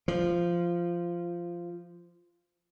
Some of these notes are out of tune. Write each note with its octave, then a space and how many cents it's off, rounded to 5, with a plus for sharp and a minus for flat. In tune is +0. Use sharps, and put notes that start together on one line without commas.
F3 -10